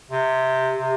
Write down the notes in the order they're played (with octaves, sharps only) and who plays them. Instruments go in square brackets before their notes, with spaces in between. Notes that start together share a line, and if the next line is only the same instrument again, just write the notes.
[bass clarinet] C3 [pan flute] G4
[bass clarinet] C3